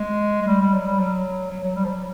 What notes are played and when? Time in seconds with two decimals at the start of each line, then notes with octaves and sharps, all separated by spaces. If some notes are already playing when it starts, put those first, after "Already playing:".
Already playing: G#3
0.41 G#3
0.47 G3
0.60 G3
0.73 F#3
0.86 G3
0.99 F#3
1.50 F#3
1.64 F#3
1.75 G3
1.84 F3
1.89 F#3